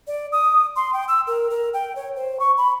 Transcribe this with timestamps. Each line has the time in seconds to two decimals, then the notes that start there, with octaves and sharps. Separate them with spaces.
0.07 D5
0.32 D#6
0.76 C6
0.93 G5
1.08 E6
1.27 A#4
1.50 A#4
1.73 G5
1.95 C#5
2.16 C5
2.40 C#6
2.57 B5